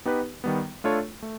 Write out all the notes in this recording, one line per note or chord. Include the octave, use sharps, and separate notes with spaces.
B3 D#4 G4 B4
D#3 G3 B3
A3 D4 F4 A4 C#5
A3